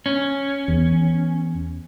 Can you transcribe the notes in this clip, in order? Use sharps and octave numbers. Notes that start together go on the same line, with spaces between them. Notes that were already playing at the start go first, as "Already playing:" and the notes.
C#4
E2